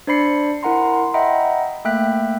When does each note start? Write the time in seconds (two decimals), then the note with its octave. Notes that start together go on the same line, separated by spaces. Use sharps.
0.07 D4 C5 D5 B5 C7 C#7
0.63 E4 A#4 F#5 A#5 C6
0.94 C6
1.14 D#5 E5 F#5 G5 A#5 B5
1.85 A3 A#3 E5 G5 F#6 B6